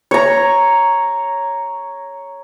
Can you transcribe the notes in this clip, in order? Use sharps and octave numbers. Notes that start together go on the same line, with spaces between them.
C#5 A#5